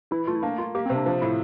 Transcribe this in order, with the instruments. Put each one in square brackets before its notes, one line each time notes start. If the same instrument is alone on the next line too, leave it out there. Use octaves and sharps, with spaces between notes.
[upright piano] E3 [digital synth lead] E4
[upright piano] A3 [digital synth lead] F4
[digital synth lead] E4
[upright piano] A#3 [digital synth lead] D4
[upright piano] A#3 [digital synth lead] F4
[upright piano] A#3 [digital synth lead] G4
[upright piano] C3 [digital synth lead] C4
[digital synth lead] D4
[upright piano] F3 [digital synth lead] D4
[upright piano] A2 [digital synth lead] E4